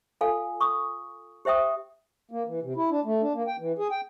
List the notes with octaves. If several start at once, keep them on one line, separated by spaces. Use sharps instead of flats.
F4 A4 F5 G#5
C#6 D#6
G4 C5 E5 G5 D#6
A#3
E3
C3
E4
D4
A3
D4
A#3
G5
E3
G#4
G5